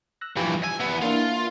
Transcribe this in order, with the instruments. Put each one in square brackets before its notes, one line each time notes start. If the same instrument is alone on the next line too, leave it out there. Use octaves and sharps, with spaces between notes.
[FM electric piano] E6 F#6 A#6
[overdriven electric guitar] G2 E3 [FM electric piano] F3 G4
[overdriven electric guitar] G#5 [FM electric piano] E6
[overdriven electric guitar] E2 B3
[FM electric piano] A#3 D4 E4 [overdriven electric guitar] F4